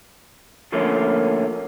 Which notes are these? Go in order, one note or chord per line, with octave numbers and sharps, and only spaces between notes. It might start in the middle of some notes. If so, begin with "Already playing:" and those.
D3 F3 A3 A#3 C#4